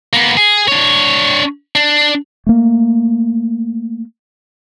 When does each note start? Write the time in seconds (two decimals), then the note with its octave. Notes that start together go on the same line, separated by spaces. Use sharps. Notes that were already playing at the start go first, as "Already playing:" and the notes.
0.13 A#3 B3
0.37 G#4
0.68 D4 C#5
1.75 D4
2.47 A3 A#3